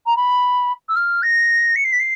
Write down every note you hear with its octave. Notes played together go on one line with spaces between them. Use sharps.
A#5
B5
E6
F6
A#6
C#7
C7
B6
C7